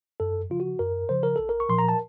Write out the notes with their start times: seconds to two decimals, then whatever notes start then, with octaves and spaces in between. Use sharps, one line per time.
0.20 F#2 A4
0.50 C#3 F3 F4
0.60 F#4
0.79 F#2 A#4
1.09 C#3 F3 C5
1.23 A#4
1.36 A#1 A4
1.49 A#4
1.60 C#6
1.69 A#2 F3 C6
1.79 A#5
1.89 A5